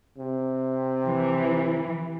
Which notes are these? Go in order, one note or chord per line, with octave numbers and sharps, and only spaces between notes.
C3
E3